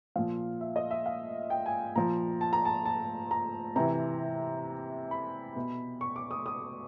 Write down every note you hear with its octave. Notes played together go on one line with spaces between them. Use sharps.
A#2 F3 F5
E5
D#5
E5
F5
G5
G#5
A#2 F3 A#5
A5
A#5
A5
A5
A#5
C3 E3 A#5
B5
B2
C#6
D6
D#6
D#6